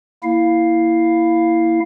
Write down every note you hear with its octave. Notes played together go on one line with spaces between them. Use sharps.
A#3 E4 F5